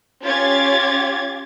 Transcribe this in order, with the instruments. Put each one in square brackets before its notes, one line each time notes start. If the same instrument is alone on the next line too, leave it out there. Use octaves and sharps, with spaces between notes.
[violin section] C#4 F4 G4 C#5 G#6 A6